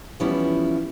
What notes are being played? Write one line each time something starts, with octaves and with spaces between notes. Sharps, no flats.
E3 F3 G3 B3 C#4 E4